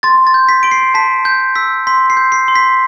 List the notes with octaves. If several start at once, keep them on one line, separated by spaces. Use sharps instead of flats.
C6 A6
A6
G6
B6
C6 D7
C7
A5 B6
G6
E6 B6
C6 B6
C7
G6
C7
C6
B6